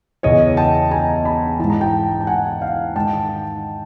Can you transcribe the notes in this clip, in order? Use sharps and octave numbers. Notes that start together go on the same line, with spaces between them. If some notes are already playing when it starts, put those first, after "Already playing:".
E2 C#3 E3 C#5 D#5
G5 A5
G#5 A#5
A5 B5
G#2 E3 A5
A#5
G5 A5
A5
F#5 G#5
F5 G5
G#2 D#3 G5 A5